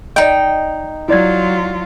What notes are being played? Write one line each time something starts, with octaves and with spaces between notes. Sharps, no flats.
D#4 D5 D#5 G5
F#3 E4 F4 D5 G#6